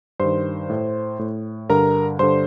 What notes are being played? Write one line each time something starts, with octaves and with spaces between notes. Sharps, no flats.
G2 D#3 C5 C6
A2
A2
G2 D3 A#4 A#5
G2 D3 C5 C6